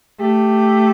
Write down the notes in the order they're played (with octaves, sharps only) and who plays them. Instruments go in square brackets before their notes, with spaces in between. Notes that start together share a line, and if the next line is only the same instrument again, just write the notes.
[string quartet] A3 [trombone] G4